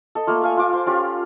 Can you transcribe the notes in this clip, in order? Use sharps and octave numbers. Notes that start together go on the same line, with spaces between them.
A4 D#5
A3 A#3 F4
A4 F5 G#5
F4 D6
C5
C#4 F4 G4